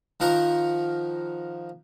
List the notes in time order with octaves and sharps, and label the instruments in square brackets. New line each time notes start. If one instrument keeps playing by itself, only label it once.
[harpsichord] D#3 F3 A#4 F#5 A#5